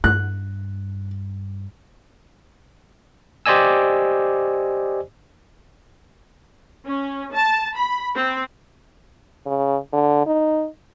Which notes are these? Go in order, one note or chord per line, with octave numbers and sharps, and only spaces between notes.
G2 F#6
G4 C5 D5 D#5 G#5 E6
C#4
A5
B5
C4
C#3
D3
D#4